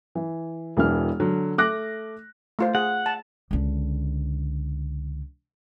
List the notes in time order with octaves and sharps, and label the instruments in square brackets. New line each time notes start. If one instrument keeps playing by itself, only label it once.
[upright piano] E3
E1 E3 D4 F6
D3 F#3
A3 D6 F#6 A#6
[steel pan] A3 F4 C5
[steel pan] G#4 [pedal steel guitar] F#5
[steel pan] A5
[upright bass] C#2 D3